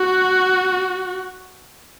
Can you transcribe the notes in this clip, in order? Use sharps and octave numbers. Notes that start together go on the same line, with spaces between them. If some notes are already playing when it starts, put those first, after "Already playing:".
Already playing: F#4